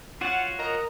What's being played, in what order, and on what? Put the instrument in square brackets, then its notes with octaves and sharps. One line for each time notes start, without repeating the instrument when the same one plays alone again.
[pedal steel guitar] F4 F#4 C#5 [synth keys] F#5 A6
[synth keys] A#4 D#5 A#5